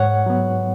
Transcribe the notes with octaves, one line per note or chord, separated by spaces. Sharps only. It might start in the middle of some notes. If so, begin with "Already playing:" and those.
Already playing: G#2 C#5 F#5
F#3 B3